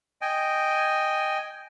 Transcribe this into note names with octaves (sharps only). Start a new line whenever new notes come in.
D#5 G5 G#5